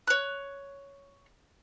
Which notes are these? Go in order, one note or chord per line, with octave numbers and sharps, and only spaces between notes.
C#5 F#6